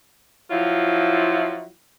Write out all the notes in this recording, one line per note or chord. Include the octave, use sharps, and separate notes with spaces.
F3 F#3 E4 F4